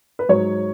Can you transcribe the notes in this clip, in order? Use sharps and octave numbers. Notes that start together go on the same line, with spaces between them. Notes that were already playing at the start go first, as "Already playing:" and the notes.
B4
G#2 F#3 C#5